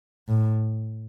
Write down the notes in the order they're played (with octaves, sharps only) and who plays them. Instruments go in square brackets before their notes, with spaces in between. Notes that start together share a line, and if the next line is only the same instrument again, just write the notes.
[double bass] A2